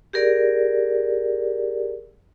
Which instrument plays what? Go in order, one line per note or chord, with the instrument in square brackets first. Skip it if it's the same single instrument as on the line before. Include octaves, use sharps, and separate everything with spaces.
[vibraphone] G4 G#4 A#4 D5